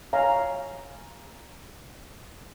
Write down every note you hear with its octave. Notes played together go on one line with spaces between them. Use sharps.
C#5 F5 G#5 A#5